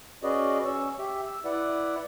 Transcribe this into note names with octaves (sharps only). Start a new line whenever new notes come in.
C#4 F#4 G#4 B4 D5 D#5
C#4 C#6 E6
G4 E5
E6
E4 B4 D5 F#5